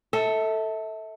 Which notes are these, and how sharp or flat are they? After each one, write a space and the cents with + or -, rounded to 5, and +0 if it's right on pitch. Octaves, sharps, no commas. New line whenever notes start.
A4 +10 E5 -30